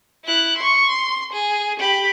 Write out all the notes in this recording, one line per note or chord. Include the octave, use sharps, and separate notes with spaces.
E4 F#6
C6 C#6
C6
G#4
G4 B5